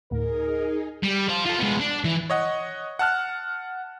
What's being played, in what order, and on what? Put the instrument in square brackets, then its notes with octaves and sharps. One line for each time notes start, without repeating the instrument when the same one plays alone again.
[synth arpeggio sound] D2 A2 [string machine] D#4 G#4 [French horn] A#4
[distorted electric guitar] G3
C5 F5
F4 A4
G#3 B3
D4
E3
[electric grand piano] C#5 D#5 F#5
F#5 A5 F6 F#6